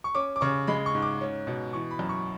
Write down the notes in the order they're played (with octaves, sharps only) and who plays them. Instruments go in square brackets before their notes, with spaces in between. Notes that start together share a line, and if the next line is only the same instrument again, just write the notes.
[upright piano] C#6
C#4 D6
D6
C#3 C#6
G#3 B5
C#6
G#2
D6
C#4
B2
E3 C#6
B5
F#2
C#6